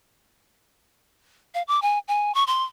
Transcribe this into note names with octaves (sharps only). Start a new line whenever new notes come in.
F5
D6
G#5
G#5
C#6
C6